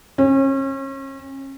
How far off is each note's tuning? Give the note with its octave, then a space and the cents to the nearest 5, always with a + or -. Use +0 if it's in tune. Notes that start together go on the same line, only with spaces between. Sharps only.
C#4 -35